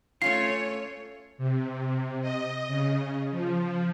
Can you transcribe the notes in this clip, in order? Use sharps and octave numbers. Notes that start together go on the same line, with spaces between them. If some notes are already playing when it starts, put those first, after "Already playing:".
A3 C#4 F4 C#5 C7
C3
D#5
C#3
F3